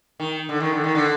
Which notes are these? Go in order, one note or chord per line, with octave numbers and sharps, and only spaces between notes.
D#3
D3
D#3
D3
D#3
D3